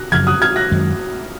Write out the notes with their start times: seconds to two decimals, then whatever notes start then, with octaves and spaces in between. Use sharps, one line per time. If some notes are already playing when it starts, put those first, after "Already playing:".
Already playing: F#6 A#6
0.12 F#2 C#3 F3 F6 G#6
0.27 D#6 F#6
0.42 F6 G#6
0.56 F#6 A#6
0.71 F#2 D#3 G#3